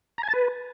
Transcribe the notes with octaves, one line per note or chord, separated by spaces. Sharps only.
A#5
G#5
A5
B4